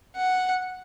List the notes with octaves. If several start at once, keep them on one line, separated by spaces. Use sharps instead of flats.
F#5